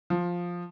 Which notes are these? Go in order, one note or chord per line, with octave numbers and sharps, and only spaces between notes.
F3